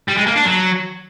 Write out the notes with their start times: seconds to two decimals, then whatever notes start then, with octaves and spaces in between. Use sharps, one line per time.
0.08 G3
0.17 G#3
0.27 A#3
0.36 D4
0.45 F#3